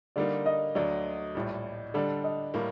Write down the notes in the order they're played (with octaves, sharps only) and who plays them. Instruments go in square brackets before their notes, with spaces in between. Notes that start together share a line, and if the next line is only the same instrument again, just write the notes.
[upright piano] D3 G3 A#3 D#4 [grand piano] D5
[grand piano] D#5
[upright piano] D2 D3 F#3 [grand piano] D5
[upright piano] A#1 A2 G3
[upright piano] D3 G3 D4 A4 [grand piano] D5
[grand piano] D#5
[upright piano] A2 G3 A#3